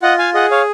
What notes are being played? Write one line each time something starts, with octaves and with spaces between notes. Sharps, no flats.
F4 D#5 F#5
F5 G#5
G#4 D#5 F#5
C#5 F5